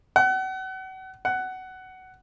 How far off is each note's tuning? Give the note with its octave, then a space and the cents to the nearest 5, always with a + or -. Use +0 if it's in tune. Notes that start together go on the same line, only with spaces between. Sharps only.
F#5 +35
F#5 +15